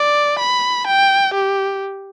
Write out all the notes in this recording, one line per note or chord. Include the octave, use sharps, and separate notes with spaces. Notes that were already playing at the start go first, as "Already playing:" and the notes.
Already playing: D5
B5
G5
G4